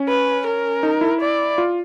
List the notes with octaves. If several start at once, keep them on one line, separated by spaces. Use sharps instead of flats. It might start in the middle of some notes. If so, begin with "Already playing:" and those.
Already playing: C#4
B4
A#4
D#4
E4
D5
F4